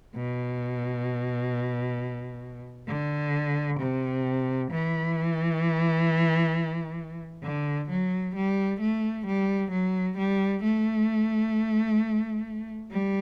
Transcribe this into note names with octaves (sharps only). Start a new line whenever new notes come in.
B2
D3
C3
E3
D3
F#3
G3
A3
G3
F#3
G3
A3
G3